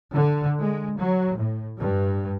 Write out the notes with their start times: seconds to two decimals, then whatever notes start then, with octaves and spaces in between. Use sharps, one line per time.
0.14 D3
0.58 G#3
0.99 F#3
1.38 A2
1.79 G2